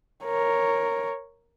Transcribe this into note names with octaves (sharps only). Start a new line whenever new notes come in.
A#4 C#5